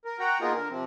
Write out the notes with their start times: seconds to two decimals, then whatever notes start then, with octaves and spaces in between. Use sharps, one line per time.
0.05 A#4
0.19 F#4 F#5 G5 A#5
0.41 A#3 B3 D#4 F4 G#4 A#4
0.54 D3 A#4
0.70 C3 F3 C4